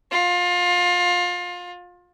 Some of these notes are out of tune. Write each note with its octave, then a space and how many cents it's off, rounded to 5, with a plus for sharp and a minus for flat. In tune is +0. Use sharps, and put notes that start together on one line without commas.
F4 +25